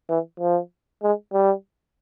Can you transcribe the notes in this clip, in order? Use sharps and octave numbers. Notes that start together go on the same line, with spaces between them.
E3
F3
G#3
G3